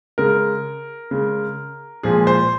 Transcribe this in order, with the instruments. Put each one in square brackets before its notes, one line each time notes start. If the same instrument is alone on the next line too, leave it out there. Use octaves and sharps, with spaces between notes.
[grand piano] C#3 G#3 A#4
C#3 G#3
A#2 F3 G#3 G#4
C5